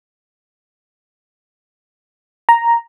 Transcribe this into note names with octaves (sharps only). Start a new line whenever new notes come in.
A#5